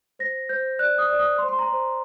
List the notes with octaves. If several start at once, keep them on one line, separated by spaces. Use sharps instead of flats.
C5 A#6
C5 G6
D5 F#6
D#6
D5
D#6
C5 C6
C6
A#5
C5